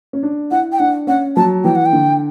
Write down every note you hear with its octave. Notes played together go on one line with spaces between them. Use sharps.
C#4
D4
E4 F#5
G5
D4 F#5
C#4 F#5
F#3 A5
E3 G5
F#5
G5
D3